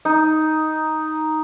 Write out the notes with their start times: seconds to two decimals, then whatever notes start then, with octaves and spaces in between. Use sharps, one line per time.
0.05 D#4